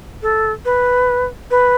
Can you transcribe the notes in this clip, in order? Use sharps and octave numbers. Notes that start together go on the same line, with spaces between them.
A4
B4
B4